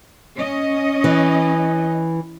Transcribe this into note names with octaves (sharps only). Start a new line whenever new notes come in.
C#4 D#5
E3